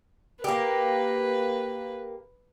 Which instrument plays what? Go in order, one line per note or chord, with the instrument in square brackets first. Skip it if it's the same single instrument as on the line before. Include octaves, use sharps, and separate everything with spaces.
[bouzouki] A#3 G4 [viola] B4